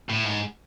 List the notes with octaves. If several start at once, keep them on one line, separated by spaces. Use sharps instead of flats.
A2
G#2